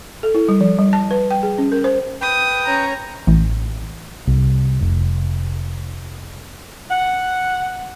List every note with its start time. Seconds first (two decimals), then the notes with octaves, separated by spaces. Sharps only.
0.23 A4
0.35 E4
0.49 G3
0.61 F3
0.79 G3
0.93 A5
1.11 B4
1.31 G5
1.43 G#4
1.58 C#4
1.72 A#4
1.84 C5
2.21 B4 G5 D#6
2.65 C#4 C#5 A#5
3.27 A1
4.27 C2
4.81 F1
6.90 F#5